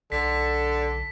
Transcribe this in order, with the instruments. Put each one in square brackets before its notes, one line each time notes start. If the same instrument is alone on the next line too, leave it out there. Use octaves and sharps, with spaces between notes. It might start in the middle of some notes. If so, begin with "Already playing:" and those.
[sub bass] B1 [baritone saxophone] D3 [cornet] A4 [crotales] B6